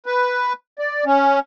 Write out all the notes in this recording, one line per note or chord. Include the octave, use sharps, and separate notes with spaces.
B4
D5
C#4